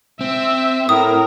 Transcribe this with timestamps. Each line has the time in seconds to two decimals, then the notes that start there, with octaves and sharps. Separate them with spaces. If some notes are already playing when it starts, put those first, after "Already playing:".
0.21 C4 E5
0.89 A2 A#4 D#6